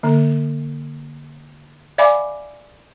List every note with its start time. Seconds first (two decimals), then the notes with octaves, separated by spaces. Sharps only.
0.03 D3 A#3
1.98 D5 E5 F5 G#5 B5 D6